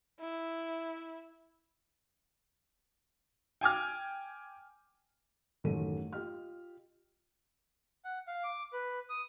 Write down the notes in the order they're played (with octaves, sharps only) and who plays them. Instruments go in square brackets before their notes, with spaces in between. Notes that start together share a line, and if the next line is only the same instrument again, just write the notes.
[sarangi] E4
[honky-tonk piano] G5 G#5 D6 F6
[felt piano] A1 F#2 D#3 A3 A4 D#7
F4 G4 D#5 F6
[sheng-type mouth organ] F#5
F5
D6
B4
D#6